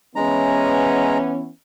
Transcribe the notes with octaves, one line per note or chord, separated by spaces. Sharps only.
E3 G#3 B3 C#4 A#5